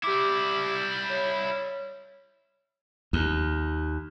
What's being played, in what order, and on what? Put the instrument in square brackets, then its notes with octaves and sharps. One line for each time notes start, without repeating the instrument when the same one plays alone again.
[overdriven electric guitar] G3 E4 [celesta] G4 D6
[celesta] C#5
[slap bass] D#2